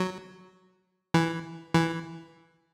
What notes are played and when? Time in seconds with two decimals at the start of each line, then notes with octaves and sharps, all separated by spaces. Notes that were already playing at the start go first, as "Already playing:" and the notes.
Already playing: F#3
1.14 E3
1.74 E3